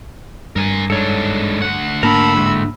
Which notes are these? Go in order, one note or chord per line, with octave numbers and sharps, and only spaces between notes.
G2 A#4 G#5
G#2 D4 A4 C#5
D2 F#5
G#2 A#3 D4 A#4 A5 B5 E6
A2 G#3 A3